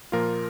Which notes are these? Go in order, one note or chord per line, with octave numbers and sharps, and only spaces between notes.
A#2 F3 A#3 F4 A#4